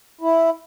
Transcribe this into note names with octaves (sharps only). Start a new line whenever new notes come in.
E4